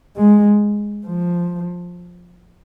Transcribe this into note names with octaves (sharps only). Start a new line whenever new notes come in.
G#3
F3